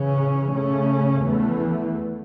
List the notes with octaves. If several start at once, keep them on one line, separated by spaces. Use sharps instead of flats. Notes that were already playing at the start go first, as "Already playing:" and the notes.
Already playing: C#3 E3 C#4
C#3 A3 C#4
E2 E3 A3